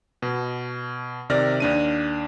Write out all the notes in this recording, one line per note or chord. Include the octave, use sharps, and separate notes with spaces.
B2
C3 D#3 D5 F6 A#6
D#2 D4 D#7